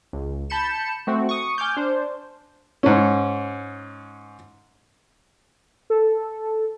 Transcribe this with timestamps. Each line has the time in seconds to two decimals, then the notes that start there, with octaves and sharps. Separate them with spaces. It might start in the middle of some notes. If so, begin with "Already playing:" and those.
0.13 C#2
0.50 A5 B5 G6 C#7 E7
1.07 A3 C4 F#4
1.29 C#6 D#6
1.58 G#5 D6 F6 G6
1.77 D4 C5
2.83 G#2 C#4
5.90 A4